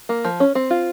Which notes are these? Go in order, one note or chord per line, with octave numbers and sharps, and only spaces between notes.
A#3
F3
C#4
C4
F4